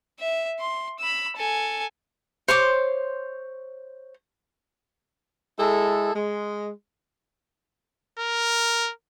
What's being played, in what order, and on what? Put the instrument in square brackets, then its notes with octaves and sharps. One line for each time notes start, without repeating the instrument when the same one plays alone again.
[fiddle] E5
C6
B5 E6
A4 G#5
[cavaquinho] C5 C#5 C6 D6
[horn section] G#3 E4 G#4 A4
G#3
[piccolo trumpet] A#4